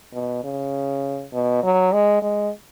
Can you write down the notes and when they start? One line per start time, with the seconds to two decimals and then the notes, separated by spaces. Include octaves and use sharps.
0.13 B2
0.44 C#3
1.33 B2
1.63 F#3
1.93 G#3
2.22 G#3